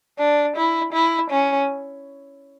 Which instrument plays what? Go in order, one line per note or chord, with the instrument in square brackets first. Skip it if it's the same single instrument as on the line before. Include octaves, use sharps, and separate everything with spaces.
[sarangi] D4
E4
E4
C#4